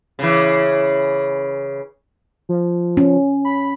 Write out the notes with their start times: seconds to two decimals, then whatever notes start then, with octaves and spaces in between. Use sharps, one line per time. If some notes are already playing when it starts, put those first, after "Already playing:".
0.19 C#3 E3
2.49 F3
2.97 C#4
3.45 B5